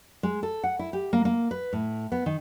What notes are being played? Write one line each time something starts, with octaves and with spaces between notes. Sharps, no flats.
G#3
A4
F#5
E4
G4
A#3
A#3
B4
A2
B3
D#3